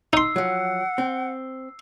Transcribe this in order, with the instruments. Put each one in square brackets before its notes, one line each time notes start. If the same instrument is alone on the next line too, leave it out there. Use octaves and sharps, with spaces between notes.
[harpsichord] D#4 C6 [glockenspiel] E6 C7
[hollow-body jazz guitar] F3 F#3 [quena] F#5
[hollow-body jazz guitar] C4